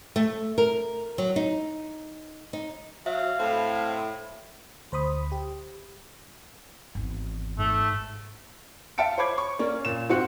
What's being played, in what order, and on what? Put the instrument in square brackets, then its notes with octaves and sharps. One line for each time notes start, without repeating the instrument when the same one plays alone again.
[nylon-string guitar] A3
A#4
F#3
D#4
D#4
[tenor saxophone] F#3 [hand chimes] E5 [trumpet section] F5
[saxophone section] A2 [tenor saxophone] C4
[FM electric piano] D2 C5 B5 D#6
G4
[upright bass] G#1 E2
[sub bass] G#2 [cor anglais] A3
[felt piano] E5 F5 A5 C#7 D7
C5 C#5 B5 D6 G#6
C#6
A#3 C#4 D5
A#2 E7
G#2 C4 F4 F#4 F#6 C#7